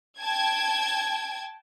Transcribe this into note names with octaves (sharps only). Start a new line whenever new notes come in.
G5 A5 G#6